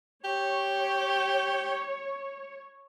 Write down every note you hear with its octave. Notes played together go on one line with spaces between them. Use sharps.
G4 C#5